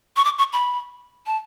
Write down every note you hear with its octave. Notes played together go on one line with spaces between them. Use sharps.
C#6
D6
C#6
B5
A5